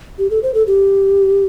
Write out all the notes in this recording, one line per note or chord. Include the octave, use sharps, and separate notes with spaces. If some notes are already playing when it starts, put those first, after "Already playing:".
G4
A4
C5
A4
G4